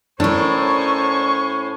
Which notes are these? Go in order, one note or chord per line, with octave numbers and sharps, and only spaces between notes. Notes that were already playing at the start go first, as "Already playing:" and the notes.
A2 C#4 D4 A#4 C5 C#6